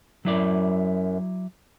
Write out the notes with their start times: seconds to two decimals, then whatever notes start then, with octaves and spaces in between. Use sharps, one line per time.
0.25 F#2 F#3 E4 D5